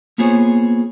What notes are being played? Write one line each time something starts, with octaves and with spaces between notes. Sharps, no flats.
A#3 B3 F4 G#4 C5 C#5